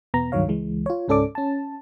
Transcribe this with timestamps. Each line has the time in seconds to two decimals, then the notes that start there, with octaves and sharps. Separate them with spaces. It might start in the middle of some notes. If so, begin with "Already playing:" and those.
0.14 E2 B2 B3 A#5
0.32 C#2 G2 D#3 F#3 C#5 F5
0.48 C#2 E3 G#3
0.86 F4 C#5
1.08 C#2 G#2 C#4 A4 D5 D6
1.35 C#4 A5